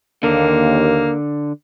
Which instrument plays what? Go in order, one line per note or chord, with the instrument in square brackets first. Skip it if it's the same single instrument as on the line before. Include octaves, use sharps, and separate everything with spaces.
[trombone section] D#2 [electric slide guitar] D3 [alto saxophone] A#3